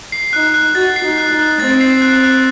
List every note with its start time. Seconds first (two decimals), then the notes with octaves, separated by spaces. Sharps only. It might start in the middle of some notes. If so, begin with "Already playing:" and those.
0.12 C7
0.33 D#4 F#6
0.54 F#6
0.75 F#4 A6
0.96 C7
1.03 D#4
1.18 F#6
1.32 D#4
1.39 F#6
1.60 C4 A6
1.81 C7
2.02 F#6
2.23 F#6